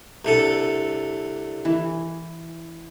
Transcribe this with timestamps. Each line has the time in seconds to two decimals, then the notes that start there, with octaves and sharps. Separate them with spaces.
0.25 C2 D3 A4
1.65 E3